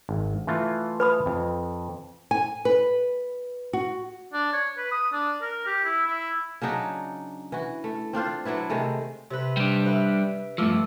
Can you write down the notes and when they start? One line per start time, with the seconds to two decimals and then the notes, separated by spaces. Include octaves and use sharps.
0.09 G#1
0.47 E3 A3 F4
1.00 B4 B5 D#6
1.26 F2
2.31 G#5
2.65 B4
3.73 F#4
4.33 D4
4.53 C#5
4.78 B4
4.91 D#6
5.12 D4
5.42 A#4
5.66 G4
5.84 E4
6.06 E4
6.62 C#3 F#3 D4 D#4
7.52 E3 F#4
7.84 A3
8.13 C4 D4 F4 C5
8.45 F#3 D4 E4 B4
8.70 C3 D#3 G#3 A3
9.30 C3 B4
9.57 G3 D4
9.86 B4 E5
10.58 G2 F3 A3 D6 E6